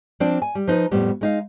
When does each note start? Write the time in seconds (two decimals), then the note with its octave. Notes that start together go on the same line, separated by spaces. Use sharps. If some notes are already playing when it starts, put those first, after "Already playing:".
0.20 F3 C4 D4 D5 A5
0.42 G#5
0.55 G3
0.67 F3 D#4 B4
0.91 F2 A2 G3 B3
1.21 G#3 D#4 F5